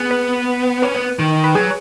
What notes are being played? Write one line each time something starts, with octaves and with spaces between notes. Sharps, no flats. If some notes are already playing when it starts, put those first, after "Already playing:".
Already playing: B3 G#4
B4
C#4 B4
B3
D#3
B4
F#3 G#4